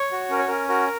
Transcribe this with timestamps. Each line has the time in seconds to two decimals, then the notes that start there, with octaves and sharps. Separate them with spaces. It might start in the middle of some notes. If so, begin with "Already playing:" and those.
Already playing: C#5
0.12 F#4
0.30 C#4 A#4
0.39 C#5
0.48 C#4 A#4
0.69 F#4 A#4